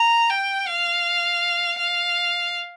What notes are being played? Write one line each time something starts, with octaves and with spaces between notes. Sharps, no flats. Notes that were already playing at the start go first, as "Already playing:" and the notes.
Already playing: A#5
G5
F5
F5